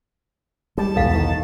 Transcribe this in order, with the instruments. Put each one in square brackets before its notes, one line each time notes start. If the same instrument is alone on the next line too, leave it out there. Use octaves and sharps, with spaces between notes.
[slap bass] G3 [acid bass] G#3 [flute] A5
[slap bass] B1 A2 [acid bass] E2 [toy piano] A4 F5 F#5
[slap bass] D#3